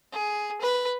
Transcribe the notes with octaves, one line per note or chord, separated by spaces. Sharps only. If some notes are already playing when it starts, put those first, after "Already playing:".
G#4
B4